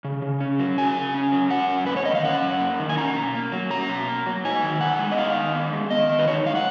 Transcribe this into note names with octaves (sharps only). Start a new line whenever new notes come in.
C#3
C#3
C#4
F#3
C#3 G#5
C#3
C#4
F#3
C#4 F#5
F#2
A#3 B4
C#5
D#3 D#5
F5
C#4 F#5
F#2
A#3
D#3
G#5
C#4 A#5
B2
A#3
F#3
C#4 A#5
B2
A#3
F#3
D#4 G#5
D#3
B3 F#5
G#3
D#5
D#4 F5
D#3
B3
G#3
D#3 D#5
D#3
B4
D#4 C#5
G#3 F5
F#5